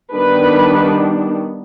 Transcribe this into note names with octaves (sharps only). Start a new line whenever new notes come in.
D#3 G3 B3 D4 B4